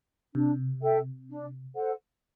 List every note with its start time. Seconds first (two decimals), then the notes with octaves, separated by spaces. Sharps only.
0.35 C3 D4
0.82 A4 E5 G5
1.29 D4
1.76 A4 C5 F#5